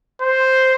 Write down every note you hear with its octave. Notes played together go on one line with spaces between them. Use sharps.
C5